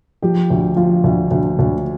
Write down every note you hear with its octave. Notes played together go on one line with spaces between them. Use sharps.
F3 G4
D2
F3 F4
D2
D2
D2